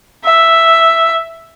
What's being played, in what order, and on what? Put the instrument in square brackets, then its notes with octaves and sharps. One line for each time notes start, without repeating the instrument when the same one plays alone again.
[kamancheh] E5